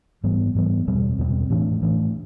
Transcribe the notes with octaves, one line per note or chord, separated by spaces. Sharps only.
G#2 E3 G3 B3
G#2 E3 G3 B3
E2 B2 G3 C4
E2 B2 G3 C4
A2 E3 A3 D4
A2 E3 A3 D4